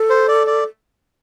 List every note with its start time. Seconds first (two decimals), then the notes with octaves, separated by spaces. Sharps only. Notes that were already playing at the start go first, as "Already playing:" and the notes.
Already playing: A4
0.10 C5
0.28 D5
0.47 D5